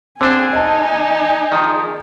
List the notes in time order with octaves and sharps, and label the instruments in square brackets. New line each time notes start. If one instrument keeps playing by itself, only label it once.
[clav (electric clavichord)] D3 D4 C5 [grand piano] C4 [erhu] G#4 [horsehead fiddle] G#5
[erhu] D#4 [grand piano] D#5 A5
[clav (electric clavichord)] D#3 F3 [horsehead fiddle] G#4